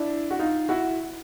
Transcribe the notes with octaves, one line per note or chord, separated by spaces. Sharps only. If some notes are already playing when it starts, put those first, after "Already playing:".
Already playing: D4 E4
F#4
D#4 F4
E4 F#4